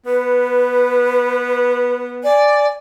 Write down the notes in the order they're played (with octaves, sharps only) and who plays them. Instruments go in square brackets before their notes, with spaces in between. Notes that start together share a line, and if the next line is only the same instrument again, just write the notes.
[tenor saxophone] B3 [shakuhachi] B4
[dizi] D5 [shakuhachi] G#5